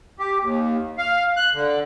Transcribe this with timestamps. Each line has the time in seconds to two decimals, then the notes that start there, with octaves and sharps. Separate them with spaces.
0.19 G4
0.42 D#2
0.98 F5
1.37 F#6
1.54 D3